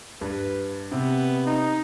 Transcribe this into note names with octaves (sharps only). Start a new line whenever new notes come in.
G2 B4
C3 B3
D#4